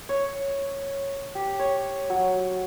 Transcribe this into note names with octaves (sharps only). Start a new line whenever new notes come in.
C#5
G4
C#5
F#3